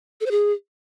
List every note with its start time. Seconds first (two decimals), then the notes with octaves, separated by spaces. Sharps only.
0.21 A4
0.26 C5
0.31 G#4